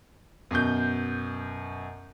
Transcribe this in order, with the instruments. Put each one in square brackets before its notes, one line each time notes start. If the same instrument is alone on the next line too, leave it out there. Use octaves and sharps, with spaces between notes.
[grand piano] F#2 B2 G6